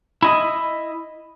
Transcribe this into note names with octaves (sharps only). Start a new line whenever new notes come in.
E4 D#5